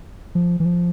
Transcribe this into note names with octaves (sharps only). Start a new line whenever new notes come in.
F3
E3
F3